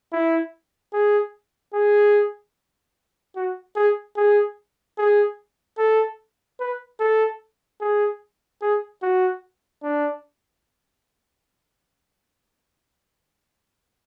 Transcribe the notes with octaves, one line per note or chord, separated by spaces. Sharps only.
E4
G#4
G#4
F#4
G#4
G#4
G#4
A4
B4
A4
G#4
G#4
F#4
D4